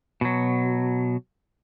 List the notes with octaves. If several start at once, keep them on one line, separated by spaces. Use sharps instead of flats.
B2 F#3